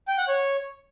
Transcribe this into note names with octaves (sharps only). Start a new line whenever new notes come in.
G5
F#5
C#5